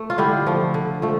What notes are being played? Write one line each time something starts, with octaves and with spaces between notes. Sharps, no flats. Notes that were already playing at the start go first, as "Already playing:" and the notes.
Already playing: A3
F4
D3 E4 G4
F3 A3
D3
F3 A3